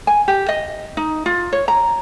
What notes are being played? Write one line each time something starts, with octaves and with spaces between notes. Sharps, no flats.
G#5
G4
D#5
D#4
F4
C#5
A#5